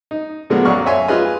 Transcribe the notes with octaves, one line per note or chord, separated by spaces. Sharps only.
D#4
A#2 D3 F#3 G#3 A#3 B3
A#1 F#2 D5 F5 C#6 F6
C#5 E5 F5 G#5 C6
F4 G#4 B4 D#5 G#5